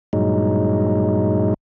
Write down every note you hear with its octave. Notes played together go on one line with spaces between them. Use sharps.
G2 A#2 F#3 G#3 D#4